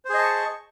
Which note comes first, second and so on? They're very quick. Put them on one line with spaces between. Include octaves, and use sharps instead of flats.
C5 G#4 D#5 A5 C#6